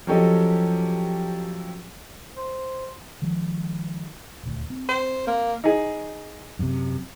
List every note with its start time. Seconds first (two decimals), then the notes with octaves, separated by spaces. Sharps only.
0.07 F3 F#3 C#4 G4 A4 D#5
2.37 C5
3.22 D#3 F3 G#3
4.43 D#1 D2
4.70 C4
4.89 C5
5.27 A#3
5.64 D#4 G#4
6.59 F#2 C3